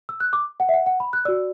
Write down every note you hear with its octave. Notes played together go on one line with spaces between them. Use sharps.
E6
F#6
D6
F#5
E5
F#5
F#5
B5
F#6
F#4 D5 E6